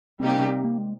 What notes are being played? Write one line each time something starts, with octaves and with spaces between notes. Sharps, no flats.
C3 G3 A#3 C4 D#4 G4
C#4
C4
A#3
G#3